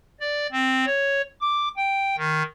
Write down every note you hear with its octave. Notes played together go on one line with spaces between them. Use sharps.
D5
C4
C#5
D6
G5
D#3